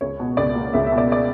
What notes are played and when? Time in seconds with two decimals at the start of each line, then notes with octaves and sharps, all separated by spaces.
0.01 C#2 C#5
0.20 B2
0.37 C#2 D5
0.55 A#3
0.73 C#2 E5
0.86 E5
0.92 B2
0.98 D5
1.12 D5